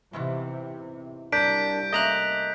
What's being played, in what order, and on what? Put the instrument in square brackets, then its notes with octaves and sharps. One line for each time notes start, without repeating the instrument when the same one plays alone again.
[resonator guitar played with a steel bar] E2 G#2 E3 [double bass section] C3
[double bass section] C2 [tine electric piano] D4 [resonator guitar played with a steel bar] A#4 [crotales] G6 B6 D7
[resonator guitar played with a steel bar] A3 A#3 C#4 [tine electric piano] D#5 A#5 F#6